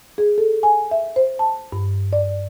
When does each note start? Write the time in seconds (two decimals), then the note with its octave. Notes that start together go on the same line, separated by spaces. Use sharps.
0.18 G#4
0.38 A4
0.63 G#5
0.91 E5
1.16 C5
1.39 A5
1.72 G2
2.13 D5